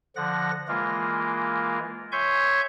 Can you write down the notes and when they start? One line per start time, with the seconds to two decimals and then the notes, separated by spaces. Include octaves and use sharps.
0.16 D3 F3 F#5 A#6
0.68 E3 G#3 A#3 F4 A#4
2.12 C#5 E5 G#5 C6 C#6 G6